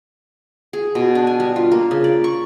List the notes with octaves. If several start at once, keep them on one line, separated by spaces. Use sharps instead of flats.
G#4
B2
D4
G#5
G3
F4
A#3
C#3
D5
C#6